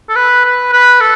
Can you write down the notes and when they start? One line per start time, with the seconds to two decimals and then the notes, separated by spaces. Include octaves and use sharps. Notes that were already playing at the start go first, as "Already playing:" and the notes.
0.09 A4
0.16 B4
0.45 B4
0.73 B4
1.01 A4